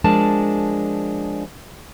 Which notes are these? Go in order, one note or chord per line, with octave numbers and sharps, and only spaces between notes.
F3 G#3 D4 A#4 A5